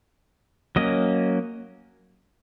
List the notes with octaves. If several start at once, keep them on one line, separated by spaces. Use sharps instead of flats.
F#3 A#3 C#4 D#5